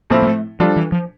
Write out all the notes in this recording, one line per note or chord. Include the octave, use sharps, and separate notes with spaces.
A2 F3 A#3 C4 E4
A#3
A3
F3 G3 D4 F4 A4
E3
F3